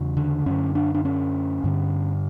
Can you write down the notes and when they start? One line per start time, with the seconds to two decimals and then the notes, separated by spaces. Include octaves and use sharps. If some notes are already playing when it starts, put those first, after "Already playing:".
Already playing: E2 C#3
0.17 D3
0.46 F#2 D3 C#4
0.75 D4
0.94 D4
1.05 C#4
1.64 G2 D3